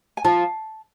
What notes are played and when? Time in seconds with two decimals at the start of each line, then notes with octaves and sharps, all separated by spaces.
0.17 G#5
0.25 F3 F4 A5